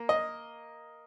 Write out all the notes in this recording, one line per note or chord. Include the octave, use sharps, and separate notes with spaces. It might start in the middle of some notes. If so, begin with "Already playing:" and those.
Already playing: A#3
D#5